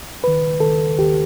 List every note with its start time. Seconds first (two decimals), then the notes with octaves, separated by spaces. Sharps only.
0.23 D#2 D#3 B4
0.60 D#2 D#3 A4
0.98 D#2 D#3 G4